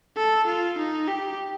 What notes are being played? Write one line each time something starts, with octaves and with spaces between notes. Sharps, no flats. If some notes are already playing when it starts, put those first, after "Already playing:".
A4
F4
D#4
G4